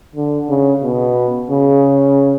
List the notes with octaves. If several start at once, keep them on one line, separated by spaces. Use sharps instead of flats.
D3
C#3
B2
C#3